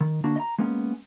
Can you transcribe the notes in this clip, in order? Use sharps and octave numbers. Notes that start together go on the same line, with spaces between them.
D#3
D3 A#3 D4 F#4
D#5 A#5
G#3 A#3 B3 C#4